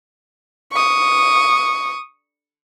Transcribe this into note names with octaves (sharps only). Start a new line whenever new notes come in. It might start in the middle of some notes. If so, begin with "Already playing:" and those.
C#6 D#6